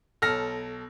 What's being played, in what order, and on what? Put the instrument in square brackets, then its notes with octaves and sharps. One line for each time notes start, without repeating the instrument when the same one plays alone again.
[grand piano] B1 A4 F6 A#6